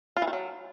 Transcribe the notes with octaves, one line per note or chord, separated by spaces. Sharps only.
F4
E3
D#3
F#3